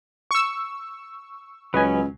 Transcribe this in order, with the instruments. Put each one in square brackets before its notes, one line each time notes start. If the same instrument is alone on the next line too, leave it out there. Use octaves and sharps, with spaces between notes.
[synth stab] C#6 E6
[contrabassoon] C#2 [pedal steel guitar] F#3 C#4 [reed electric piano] B4 D#5 G#5